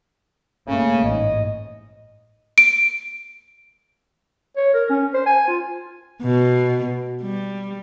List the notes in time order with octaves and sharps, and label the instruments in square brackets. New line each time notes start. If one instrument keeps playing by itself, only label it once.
[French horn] C#3 [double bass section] A3 A#3 C#4
[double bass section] A1 G#2 [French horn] D#5
[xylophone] D7
[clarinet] C#5
A#4
C#4
C5
G#5
F4
[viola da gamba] B2
G3